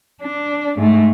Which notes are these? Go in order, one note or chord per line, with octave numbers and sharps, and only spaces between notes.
D4
G#2 A3